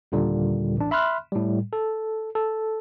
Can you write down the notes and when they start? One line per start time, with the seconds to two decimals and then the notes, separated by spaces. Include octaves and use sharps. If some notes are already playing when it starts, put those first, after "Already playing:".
0.12 D#2 A#2 D3 G3
0.77 A1 D4
0.91 E5 B5 C6 F6 F#6
1.32 A2 G3
1.73 A4
2.35 A4